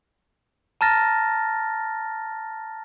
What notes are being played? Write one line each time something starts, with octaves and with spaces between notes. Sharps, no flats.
A5 A#5 F6 A6 A#6